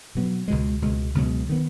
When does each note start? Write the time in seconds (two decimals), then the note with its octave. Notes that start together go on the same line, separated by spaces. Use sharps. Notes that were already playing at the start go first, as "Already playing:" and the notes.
0.15 B2 F#3 B3
0.48 C#2 B2 G#3
0.82 C#2 B2 G#3
1.15 C#2 B2 F#3
1.49 D#3 B3